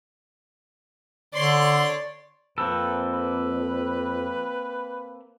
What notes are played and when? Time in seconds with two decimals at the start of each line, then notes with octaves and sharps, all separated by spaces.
1.34 D3 C#5 D5 C6
2.58 F2 A#3 C4 A4 B4
3.13 B4